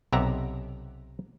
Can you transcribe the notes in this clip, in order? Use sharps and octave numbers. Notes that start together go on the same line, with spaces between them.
B1 C3 G4 E5 F#5 A#5